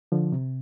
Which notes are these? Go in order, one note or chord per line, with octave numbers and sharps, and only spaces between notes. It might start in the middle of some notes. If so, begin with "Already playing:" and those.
D3 F3
C3